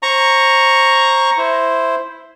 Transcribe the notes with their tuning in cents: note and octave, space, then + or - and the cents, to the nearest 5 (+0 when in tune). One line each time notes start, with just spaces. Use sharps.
C5 +25 A#5 +0 C#6 +0
E4 +0 C5 +0